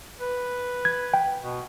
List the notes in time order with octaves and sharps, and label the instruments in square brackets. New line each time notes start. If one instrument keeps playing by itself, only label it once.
[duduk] B4
[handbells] G#6
G5
[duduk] B2